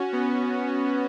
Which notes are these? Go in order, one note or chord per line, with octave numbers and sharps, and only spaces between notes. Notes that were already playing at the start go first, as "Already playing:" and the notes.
Already playing: C#4 F#4
B3